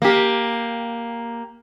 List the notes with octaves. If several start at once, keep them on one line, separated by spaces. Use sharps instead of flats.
A#3 G4